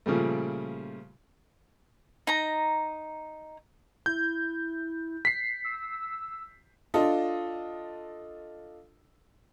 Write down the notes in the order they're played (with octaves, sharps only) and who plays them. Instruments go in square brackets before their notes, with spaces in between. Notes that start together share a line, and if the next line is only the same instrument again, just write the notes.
[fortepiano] A#2 C#3 F3 G3 A3
[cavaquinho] D#4 A#5
[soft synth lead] E4 [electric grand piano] G6
[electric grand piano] B6 C7
[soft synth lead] E6
[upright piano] D4 F4 A4 D#5